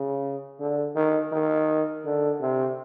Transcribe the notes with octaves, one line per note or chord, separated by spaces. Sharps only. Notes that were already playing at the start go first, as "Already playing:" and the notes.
Already playing: C#3
D3
D#3
D#3
D3
C3